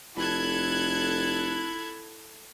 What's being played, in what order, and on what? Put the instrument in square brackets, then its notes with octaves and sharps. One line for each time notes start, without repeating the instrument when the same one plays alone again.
[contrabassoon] F1 [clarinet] E4 [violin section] A4 F#6 G#6